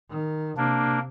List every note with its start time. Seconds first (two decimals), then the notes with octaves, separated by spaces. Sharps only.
0.10 D#3
0.57 C3 A#3 D4